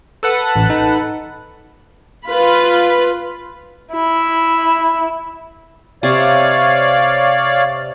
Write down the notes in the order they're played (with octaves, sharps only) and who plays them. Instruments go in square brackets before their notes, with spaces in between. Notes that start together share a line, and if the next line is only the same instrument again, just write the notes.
[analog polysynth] A4 B4 F#5
[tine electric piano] A1
D#4
[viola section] F4 B4 B5
[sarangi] E4
[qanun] C3 [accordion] C#5 D5 F5